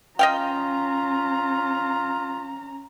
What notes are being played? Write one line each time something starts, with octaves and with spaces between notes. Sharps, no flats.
C#4 F4 D#5 F5 G5 A#5